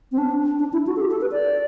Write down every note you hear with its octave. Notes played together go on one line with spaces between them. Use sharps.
C4
D4
D4
E4
F#4
A4
G4
A4
B4
D5